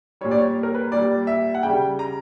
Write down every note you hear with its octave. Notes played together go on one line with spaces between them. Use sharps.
A#2 G3 C#5
D5
C#5
A#4
B4
A#2 G3 D5
E5
F#5
C#3 G3 G5
A#5